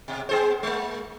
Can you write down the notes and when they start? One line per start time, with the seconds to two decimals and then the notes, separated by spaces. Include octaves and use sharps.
0.08 B2
0.29 B3 G#4 C5
0.63 G#3 A#3